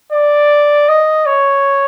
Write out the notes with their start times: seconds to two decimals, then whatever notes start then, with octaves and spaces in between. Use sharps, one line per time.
0.12 D5
0.88 D#5
1.26 C#5